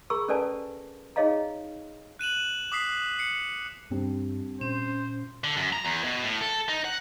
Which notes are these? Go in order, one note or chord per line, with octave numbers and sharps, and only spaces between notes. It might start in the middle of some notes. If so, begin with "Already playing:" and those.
G#4 A#4 A#5 B5 C#6 E6
C#4 A4 B4 D5 G#5 A5
D#4 G#4 C#5 D#5 F5 A#5
F#6 D#7 E7 F#7
D6 D#6 B6 C7
C7 C#7
G2 G3 C4 D4
A#2 C#4 C5
D3
F#2
A#5
E2
B2
A2
A4
D#4
F#5